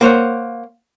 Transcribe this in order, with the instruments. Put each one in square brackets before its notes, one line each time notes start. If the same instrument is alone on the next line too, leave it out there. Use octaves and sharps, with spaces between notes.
[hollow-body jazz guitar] A#3 C5 C#5 F#5